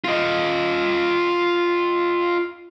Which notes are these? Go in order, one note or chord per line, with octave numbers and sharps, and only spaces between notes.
F4 D#5